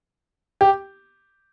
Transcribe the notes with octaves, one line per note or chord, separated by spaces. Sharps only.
G4